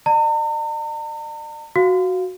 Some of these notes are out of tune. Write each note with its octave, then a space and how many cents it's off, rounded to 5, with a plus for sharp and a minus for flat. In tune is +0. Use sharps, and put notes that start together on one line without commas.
D5 +40 A#5 -45
F#4 +0 F5 +0